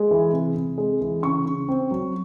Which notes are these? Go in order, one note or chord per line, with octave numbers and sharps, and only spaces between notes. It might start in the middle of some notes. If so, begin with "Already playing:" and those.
Already playing: G#3
E3
C3
C3
G#3
E3
C#3 C#6
C#3
C4
F#3